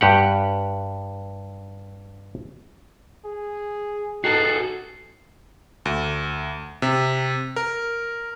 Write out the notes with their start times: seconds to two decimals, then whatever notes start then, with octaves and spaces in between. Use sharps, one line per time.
0.01 G2 G4 F#5
3.25 G#4
4.24 D#4 F#4 G#4 A4 C7
5.85 D2
6.82 C3
7.56 A#4